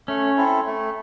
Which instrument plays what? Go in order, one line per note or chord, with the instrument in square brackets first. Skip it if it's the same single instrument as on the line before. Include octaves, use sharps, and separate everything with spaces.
[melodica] A3 [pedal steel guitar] C#4
[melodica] C4 E4 A4
A3